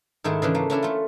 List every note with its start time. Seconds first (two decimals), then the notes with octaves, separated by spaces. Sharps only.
0.24 G#2 D#3 G#3 A3 E4
0.42 C#3 E3 D4
0.55 A3 A#3
0.70 C#4 D4 E4 D5
0.83 A3 F4